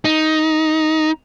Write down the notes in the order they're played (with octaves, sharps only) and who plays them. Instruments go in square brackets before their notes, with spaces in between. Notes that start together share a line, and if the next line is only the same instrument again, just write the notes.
[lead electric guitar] D#4